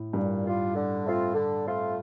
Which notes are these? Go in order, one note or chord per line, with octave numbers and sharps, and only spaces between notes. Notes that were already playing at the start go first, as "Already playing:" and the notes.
Already playing: A2
G2 A#2
G3 D4 F4
D3
A3 C4 F4
D3
A3 C4 F4